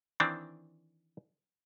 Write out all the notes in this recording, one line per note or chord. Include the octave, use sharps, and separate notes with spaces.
D#3 E3 C4 D4